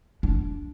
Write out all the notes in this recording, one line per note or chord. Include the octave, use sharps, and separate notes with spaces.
D4